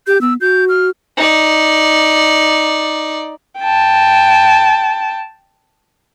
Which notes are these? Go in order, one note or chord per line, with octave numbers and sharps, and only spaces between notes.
G4 G6
B3 E6
F#4 G6
F6
D#4 D5
G5 A5